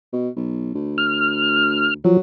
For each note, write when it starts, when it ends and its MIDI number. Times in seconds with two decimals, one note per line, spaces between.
0.13 0.29 47
0.37 0.71 35
0.74 1.96 38
0.98 1.94 89
2.04 2.17 53
2.04 2.19 54